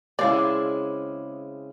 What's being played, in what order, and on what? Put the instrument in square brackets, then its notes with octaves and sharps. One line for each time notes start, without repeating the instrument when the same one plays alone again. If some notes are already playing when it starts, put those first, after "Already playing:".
[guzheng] C#3 C4 [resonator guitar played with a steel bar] G#3 E4 [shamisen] D5 F5 [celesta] D6